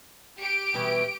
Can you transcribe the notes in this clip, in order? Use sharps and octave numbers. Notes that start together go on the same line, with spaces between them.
G4 D7
B2 E3 G3